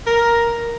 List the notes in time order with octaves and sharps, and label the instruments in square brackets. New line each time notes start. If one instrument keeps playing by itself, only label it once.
[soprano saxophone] A#4